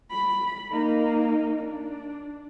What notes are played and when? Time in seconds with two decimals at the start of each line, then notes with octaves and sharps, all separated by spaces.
0.11 B5
0.71 A#3 D#4
1.59 D4